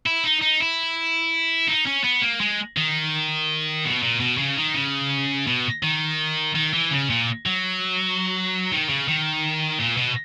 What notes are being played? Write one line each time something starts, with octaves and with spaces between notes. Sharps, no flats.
E4
D#4
D#4
E4
D#4
C#4
B3
A#3
G#3
D#3
B2
A#2
B2
C#3
D#3
C#3
B2
D#3
D#3
E3
C#3
A#2
F#3
D#3
C#3
D#3
A#2
B2